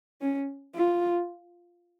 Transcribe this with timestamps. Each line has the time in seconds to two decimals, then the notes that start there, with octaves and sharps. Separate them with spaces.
0.21 C#4
0.75 F4